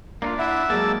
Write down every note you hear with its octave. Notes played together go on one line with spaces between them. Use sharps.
A#3 D4 D#4 F4
E4 E5 F#5
F#3 G#3 A#3 G#4 D5 A5 E6